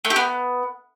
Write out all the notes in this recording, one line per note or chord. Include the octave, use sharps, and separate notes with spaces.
A3
G4
B3